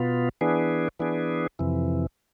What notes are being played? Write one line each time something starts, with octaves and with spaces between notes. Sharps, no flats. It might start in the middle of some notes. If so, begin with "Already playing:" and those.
Already playing: B2 B3 F4
E3 B3 D4 G#4
E3 B3 D4 G#4
F2 C3 E3